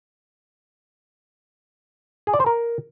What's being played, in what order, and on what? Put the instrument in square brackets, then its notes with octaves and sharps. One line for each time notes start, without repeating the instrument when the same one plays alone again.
[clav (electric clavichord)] G#4
D5
C5
A#4